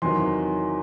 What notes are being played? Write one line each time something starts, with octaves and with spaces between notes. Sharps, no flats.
E2 C3 D#3 F#3 C6